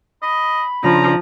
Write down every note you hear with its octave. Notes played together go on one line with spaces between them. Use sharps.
D#5 B5
C#3 F3 D4 A#5